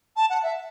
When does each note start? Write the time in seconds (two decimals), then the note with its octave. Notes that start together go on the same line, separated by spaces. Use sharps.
0.16 A5
0.29 F#5
0.42 E5